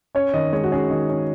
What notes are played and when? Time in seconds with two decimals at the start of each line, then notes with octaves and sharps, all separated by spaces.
0.15 C#4 C#5
0.34 D#3 D#5
0.53 G#3 C#5
0.64 F#4
0.71 C#4 G#4
0.90 D#3
1.09 C#4